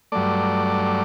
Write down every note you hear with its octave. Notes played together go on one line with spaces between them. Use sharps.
G2 F#3 A3 D5